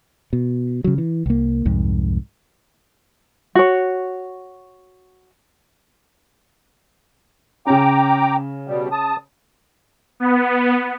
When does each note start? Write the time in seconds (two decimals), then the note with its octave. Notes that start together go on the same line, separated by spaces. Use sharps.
0.33 B2
0.84 C#3 F#3
0.98 E3
1.26 C2 A#3
1.65 C2 F2 G#2
3.55 F#4 C#5
7.66 C#3 C#4 G5 A#5 D6
8.67 B2 G3
8.92 A5 D#6
10.20 B3